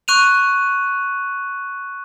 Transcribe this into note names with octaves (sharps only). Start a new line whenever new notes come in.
C#6 F#6 D#7 F7